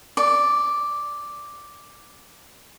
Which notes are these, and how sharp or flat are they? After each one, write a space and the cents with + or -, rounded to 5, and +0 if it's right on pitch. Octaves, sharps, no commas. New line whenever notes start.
D5 +0 D6 -45